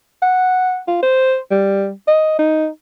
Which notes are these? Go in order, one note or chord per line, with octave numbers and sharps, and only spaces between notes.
F#5
F4
C5
G3
D#5
D#4